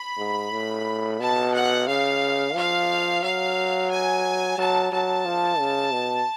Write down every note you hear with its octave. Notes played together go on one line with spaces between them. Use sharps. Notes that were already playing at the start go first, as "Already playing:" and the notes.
Already playing: B5
G#2
A2
B2 A5
F#5
C#3 F5
F3 F5
F#3 F5
G#5
F#3 A5
F#3 A5
F3
C#3
B2